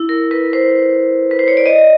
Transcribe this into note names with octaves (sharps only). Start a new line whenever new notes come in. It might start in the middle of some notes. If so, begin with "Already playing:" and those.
Already playing: E4
A#4
B4
C5
B4
C5
C#5
D5
D#5